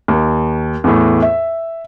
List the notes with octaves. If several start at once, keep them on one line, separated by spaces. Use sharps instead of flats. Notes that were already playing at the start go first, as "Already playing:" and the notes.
D#2
E2 A2
E5